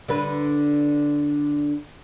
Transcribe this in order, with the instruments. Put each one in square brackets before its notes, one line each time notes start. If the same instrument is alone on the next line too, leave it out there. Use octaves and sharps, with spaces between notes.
[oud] D3 B4